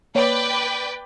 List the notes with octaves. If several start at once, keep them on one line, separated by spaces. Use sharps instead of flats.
A#3 B4 C#5 D5 G5